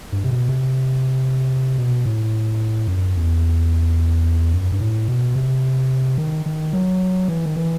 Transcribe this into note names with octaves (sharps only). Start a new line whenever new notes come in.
G2
C3
B2
C3
B2
A2
F#2
E2
F#2
G2
A2
B2
C3
D#3
D#3
F#3
E3
D#3
E3